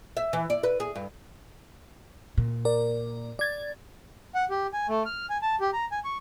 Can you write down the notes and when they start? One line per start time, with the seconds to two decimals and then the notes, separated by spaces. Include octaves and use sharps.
0.17 E5
0.33 E3
0.50 D5
0.63 B4
0.80 G#4
0.96 G2
2.38 A#2
2.65 A#4 D5
3.39 D5 G#6 A6
4.35 F#5
4.50 G4
4.73 G#5
4.88 A3
5.06 F6
5.30 G#5
5.42 A5
5.60 G4
5.73 A#5
5.92 G#5
6.04 C#6